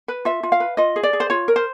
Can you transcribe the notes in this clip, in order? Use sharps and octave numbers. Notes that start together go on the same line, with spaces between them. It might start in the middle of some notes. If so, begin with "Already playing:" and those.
B4
F4 E5
F4
F5
B4
F4 D#5
G#4
D5
G#4
C5
F4 C#5
A#4
C5